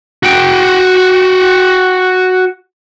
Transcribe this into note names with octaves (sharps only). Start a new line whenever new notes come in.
F#4 G5